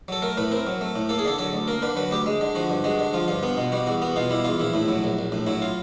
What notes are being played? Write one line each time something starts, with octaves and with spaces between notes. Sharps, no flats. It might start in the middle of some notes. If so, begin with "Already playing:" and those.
F#3 A4
A3 A#4
A2 B4
C4 A#4
F#3
A3
A2
A#3 A4
G#4
D3 A4
F#3 A4
D2
A#3 A#4
D3 B4
F#3 B4
D2 G4
G#3
D3
F3 F#4
G2
G#3 F#4
D3
F3 F4
G2 F4
B3
B2
G3 F#4
E2 F#4
B3 F#4
B2 F4
G3 E4
E2 F4
A#1 E4
A2 E4
F#3
A#1
A#1
A2
F#3 E4
F4